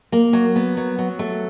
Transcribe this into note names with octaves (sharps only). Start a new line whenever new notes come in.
A#3
F#3
B3
F#3
F#3
A3